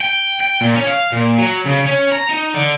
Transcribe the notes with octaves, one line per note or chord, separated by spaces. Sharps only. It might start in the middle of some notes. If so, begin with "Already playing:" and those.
G5
G5
A#2
C#4
F5
A#2
F#3
C#3
C#4
A#5
D#4
D3